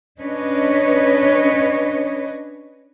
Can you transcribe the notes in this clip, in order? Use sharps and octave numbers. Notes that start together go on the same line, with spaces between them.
C#4 D4 B4 C#5 D#5